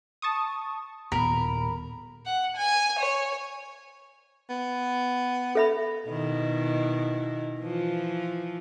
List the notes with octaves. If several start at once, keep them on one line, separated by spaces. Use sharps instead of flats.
A5 C#6 D#6
D#1 A#2 B3 A#4 B5
F#5
G#5
C#5
B3
A4 E5 B5
B2 D#3 E4
E3 F3